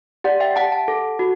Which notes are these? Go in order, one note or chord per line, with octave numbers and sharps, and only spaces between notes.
G4 D5 F#5
E5 G5
G4 F#5 A5
F#5 A5
A4
F#4